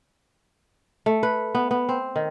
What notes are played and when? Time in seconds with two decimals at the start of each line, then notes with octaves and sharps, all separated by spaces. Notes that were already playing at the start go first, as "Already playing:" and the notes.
1.06 A3
1.23 B4
1.55 B3
1.71 B3
1.89 C4
2.16 D#3